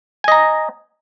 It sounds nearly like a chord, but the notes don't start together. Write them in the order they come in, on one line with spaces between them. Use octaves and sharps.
G#5 D#5 A#5